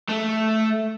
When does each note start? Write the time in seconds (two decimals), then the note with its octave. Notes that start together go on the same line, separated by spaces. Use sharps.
0.09 A3